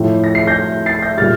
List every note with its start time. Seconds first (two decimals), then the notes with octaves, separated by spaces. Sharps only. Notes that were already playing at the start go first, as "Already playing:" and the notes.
Already playing: A2 F3
0.24 A#6
0.35 C7
0.47 G6 A#6
0.86 A6 C7
1.02 G6 A#6
1.18 A#2 G3 F6 A6